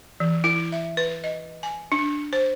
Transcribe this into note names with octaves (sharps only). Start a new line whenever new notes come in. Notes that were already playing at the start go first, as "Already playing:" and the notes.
E3
E4
E5
B4
D#5
G#5
D4
C5